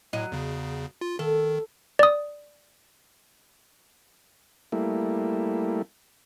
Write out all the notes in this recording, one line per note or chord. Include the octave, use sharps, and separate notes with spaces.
A2 F#3 D#5
E2 C#3
F4
D#3 A4
D5 D#6
G3 A3 A#3 E4